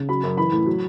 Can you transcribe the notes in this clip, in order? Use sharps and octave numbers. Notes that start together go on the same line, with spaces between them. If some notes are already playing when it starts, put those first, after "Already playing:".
Already playing: C#3
F#3 B5
F#2
E3 B5
A2
F#3